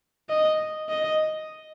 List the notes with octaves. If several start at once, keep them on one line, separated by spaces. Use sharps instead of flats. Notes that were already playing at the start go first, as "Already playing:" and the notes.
D#5
D#5